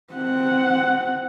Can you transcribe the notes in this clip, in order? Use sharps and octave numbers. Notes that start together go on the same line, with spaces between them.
C4 F#5